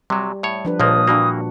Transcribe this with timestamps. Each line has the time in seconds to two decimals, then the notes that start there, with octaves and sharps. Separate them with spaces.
0.10 C3 F#3 G3
0.43 A2 C#5
0.65 F3 D4 B4
0.80 C#2 A#2 F3 A#3 D#6
1.07 G2 E3 A#3 D4 F#4